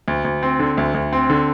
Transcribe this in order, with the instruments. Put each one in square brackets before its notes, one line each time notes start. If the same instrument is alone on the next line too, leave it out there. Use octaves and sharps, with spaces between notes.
[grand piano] D2
D2
C4
D3
D2
D2
C4
D3